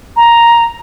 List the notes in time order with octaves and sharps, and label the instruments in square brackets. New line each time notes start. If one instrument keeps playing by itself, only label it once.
[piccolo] A#5